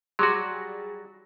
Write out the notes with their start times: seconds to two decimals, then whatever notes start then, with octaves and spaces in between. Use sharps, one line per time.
0.19 F#3 G3 F#4 G#4 C6 D6 A#6